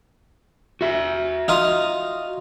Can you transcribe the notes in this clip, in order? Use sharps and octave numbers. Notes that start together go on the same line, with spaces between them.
F#4 E5
D#4 F4 D#6